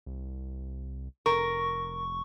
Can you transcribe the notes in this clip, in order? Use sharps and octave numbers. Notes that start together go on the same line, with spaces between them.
C2
F1 A#4 C#6